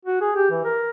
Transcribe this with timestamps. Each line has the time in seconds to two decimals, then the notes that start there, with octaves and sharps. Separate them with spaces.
0.05 F#4
0.21 G#4
0.35 G4
0.51 E3
0.65 A#4